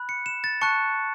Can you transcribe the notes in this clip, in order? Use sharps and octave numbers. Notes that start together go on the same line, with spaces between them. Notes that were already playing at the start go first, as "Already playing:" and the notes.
Already playing: B5 F#6
C#7
E7
A6
A5 C#6 F#6 C#7